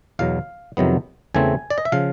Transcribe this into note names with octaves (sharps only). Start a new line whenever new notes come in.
E2 B2 F#3 F5
F2 C3 D#3 F#3 B3
E2 C#3 E3 A3 C4 G#5
D5
D#5
E5
C#3 F3 F5